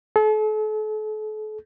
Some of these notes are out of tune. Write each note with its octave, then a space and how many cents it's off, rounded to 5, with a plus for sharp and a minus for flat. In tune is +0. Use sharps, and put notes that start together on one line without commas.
A4 -40